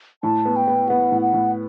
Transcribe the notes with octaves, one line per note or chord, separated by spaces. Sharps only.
A2 A5
B3
G5
B3
B3 F#5
A2
F#5
A2